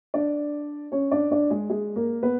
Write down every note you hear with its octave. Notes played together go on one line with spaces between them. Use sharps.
D4 D5
C#4 C#5
D4 D5
D4 D5
G#3 G#4
G#3 G#4
A#3 A#4
B3 B4